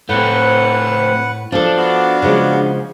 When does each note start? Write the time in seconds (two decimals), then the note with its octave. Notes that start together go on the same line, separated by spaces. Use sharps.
0.09 A2 A3 C4 B4 F#5
1.52 F3 D4 A4
1.77 B3 F#4 F5
2.22 C#3 F3 G#3